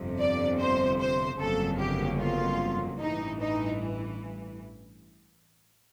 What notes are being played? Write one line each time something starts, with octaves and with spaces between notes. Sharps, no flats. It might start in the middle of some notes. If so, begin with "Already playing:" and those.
Already playing: G1 F2 C3
D5
C5
C5
G1 F2 C#3 F#3 A#3 A4
G4
F4
A1 G2 E3 D#4
D#4